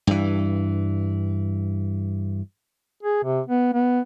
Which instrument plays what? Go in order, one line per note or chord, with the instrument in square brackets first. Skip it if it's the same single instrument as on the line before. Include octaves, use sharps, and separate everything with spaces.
[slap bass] G2 E3
[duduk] G#4
C3
B3
B3